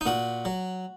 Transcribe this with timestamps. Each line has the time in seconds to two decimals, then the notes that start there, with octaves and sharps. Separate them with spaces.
0.01 D#4
0.06 A#2 F#4
0.45 F#3